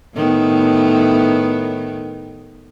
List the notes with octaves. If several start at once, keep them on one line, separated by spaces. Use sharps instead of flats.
A2 D#3 B3